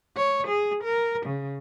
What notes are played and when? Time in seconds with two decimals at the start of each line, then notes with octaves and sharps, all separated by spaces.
0.17 C#5
0.48 G#4
0.84 A#4
1.26 C#3